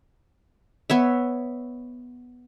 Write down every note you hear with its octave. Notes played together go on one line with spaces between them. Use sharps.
B3 C#5 E5